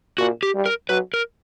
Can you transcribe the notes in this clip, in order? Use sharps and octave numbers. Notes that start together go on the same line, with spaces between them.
A#2 F#4
G4
G3
A#4
F#3 B4
A#4